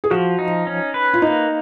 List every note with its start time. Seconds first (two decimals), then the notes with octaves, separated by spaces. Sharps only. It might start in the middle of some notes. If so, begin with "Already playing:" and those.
0.04 G#4
0.11 F3 F#4
0.39 D#4
0.67 C#4
0.94 B4
1.14 F4
1.22 A#3 D#4